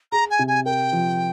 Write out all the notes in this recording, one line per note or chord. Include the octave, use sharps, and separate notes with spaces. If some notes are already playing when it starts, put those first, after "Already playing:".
G#4 A#5
G#5
C3
G#5
A#4 G5
F3